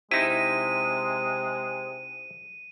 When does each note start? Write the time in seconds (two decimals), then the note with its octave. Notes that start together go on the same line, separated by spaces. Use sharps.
0.11 C3 G#3 D#4 E4 D#7